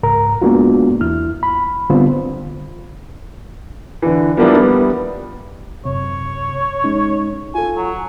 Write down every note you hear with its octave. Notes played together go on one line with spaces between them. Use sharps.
C#2 G#2 A#4 A#5
G#3 A#3 B3 D4 F4 F#4
E2 E4 F6
B5
D3 G3 B3 C4 F4 C5
D3 E3
F3 G3 A#3 B3 D4 E4
G3 B3
F#2 C3 C#5
G#3 C#4 D#4
F4 A4 G#5
F#3